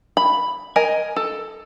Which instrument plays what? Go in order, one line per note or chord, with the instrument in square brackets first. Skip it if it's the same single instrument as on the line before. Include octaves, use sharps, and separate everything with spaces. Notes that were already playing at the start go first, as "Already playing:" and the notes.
[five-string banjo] B5
A#4 D#5 G#5
A4